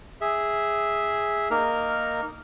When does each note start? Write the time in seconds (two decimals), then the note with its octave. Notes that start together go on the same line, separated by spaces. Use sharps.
0.21 G#4 E5
1.51 A#3 D#4 A#4 F6